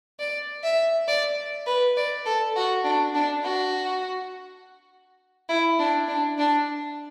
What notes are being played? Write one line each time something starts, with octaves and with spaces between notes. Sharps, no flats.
D5
E5
D5
B4
D5
A4
F#4
D4
D4
F#4
E4
D4
D4
D4